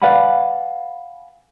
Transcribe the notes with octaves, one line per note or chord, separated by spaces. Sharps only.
B4 D5 F5 F#5 G#5 B5